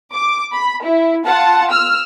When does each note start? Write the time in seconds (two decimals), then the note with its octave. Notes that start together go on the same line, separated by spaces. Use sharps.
0.13 D6
0.53 B5
0.84 E4
1.25 F4 F#5 A5
1.71 E6 F6